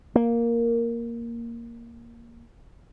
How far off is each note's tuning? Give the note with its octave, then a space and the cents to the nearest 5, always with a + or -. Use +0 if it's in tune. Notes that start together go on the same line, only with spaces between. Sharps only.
A#3 +0